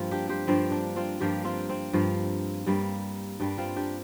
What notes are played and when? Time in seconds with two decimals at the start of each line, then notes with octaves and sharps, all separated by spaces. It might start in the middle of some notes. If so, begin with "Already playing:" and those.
Already playing: G2 F3 A#3 C4 F4
0.11 D4 G4
0.29 G4 C5
0.47 G2 F3 A#3 C4
0.72 D4
0.96 C4 F4
1.20 G2 F3 A#3 D4 G4
1.44 C4 F4
1.69 C4
1.93 G2 F3 A#3
2.66 G2 G3 A#3
3.40 G2 G3 A#3 D4
3.58 C4 F4
3.76 D4 G4